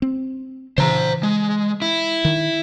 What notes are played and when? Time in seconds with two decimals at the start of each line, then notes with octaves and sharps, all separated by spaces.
0.02 C4
0.78 C#3 E3 C5 A#5
1.23 G#3
1.82 E4
2.25 D#3